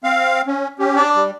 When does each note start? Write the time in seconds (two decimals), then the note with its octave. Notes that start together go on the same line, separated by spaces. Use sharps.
0.04 C4 F5
0.47 C#4
0.79 C#4 G4
0.96 D4 D5
1.15 G3